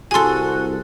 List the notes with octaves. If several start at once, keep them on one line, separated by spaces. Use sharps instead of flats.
C2 F#4 G#4 A4 G#5 C6